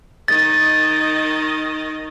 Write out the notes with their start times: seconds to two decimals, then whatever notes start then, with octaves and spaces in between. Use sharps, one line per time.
0.28 D#3 D#5 A6